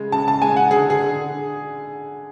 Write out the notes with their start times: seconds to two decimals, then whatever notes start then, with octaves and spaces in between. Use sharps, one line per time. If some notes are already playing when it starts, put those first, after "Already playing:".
Already playing: C#3 G#3
0.12 C#3 A5
0.28 A5
0.42 G#3 G#5
0.56 F#5
0.70 D3 G#4
0.90 G#4
0.99 D3